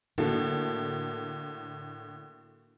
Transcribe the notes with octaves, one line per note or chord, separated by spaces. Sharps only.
A2 D3 A#3 F#4 A4